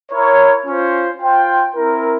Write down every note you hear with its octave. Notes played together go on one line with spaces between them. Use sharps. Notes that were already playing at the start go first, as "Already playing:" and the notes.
E4 A#4 C#5
C#4 F4 C5
F4 C5 G5
C4 E4 A#4